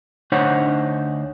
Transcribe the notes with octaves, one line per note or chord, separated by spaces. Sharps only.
D2 D4 D#4 C5 C#5 F#5